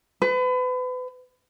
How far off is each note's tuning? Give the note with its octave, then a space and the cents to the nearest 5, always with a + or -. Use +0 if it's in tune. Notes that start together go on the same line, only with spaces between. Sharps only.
B4 +35